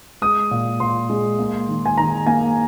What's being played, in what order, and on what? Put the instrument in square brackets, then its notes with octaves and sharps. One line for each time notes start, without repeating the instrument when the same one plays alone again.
[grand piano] G#3 D#6
A#2
A#2 C6
G#3
A#3
D#3
G#5
D#3 A#5
A#3 G#5